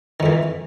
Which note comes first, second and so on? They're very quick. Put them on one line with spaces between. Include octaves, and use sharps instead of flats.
D#3 F2 E3